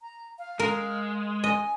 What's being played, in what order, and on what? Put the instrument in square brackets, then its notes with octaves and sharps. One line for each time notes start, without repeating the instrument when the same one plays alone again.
[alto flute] A#5
F5
[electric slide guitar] G#3 [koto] A#4
[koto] D#5 [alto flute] G#5